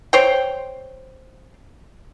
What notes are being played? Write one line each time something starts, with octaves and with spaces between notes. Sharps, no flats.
C5 C#5 G5